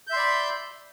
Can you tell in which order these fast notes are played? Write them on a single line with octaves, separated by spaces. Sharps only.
G6 E5 C6 D5 B5